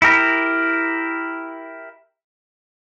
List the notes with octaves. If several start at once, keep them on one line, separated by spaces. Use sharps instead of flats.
E4 G4 A#4